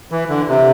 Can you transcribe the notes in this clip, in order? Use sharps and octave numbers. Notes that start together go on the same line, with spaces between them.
E3
D3
C3